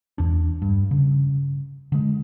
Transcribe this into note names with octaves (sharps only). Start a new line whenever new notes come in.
E2 D4
G2
C#3
D3 G#3